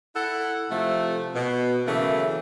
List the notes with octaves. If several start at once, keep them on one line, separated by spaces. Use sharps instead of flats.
E4 A4 F#5
C3 F3 A3
B2
C#3 E3 F#3 A3 A#3